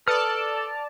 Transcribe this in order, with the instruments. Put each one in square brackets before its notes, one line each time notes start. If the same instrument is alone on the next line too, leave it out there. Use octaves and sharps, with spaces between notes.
[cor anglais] A4 [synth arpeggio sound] B4 D#6 C#7 [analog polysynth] D5 A5 [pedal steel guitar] F6